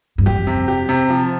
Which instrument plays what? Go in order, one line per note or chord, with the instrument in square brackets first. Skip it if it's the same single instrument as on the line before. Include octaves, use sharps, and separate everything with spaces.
[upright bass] G2
[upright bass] F2 [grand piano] G4
[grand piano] C3
G4
C3
F3